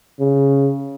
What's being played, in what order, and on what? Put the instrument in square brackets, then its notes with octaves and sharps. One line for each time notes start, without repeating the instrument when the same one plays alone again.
[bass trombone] C#3